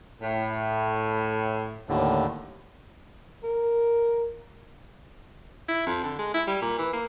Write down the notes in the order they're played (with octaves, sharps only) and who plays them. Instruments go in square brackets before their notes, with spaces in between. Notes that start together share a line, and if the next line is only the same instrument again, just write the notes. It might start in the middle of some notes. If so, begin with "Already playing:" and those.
[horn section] A2
[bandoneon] D#2 A2 D3
[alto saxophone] A#4
[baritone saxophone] E4
F2
D3
G#3
E4
G3
A#2
E3
A#3